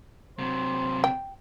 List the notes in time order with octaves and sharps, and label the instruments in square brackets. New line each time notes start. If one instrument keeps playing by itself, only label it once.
[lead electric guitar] C3 F#3 [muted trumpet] C5
[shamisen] G5